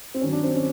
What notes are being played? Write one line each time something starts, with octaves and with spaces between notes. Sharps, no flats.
C4
G2 D#3 F#3 C#4
D4
C4
C#4